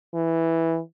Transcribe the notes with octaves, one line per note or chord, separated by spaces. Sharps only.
E3